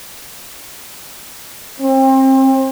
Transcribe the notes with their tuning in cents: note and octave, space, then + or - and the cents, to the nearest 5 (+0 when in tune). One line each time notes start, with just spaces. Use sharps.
C4 +30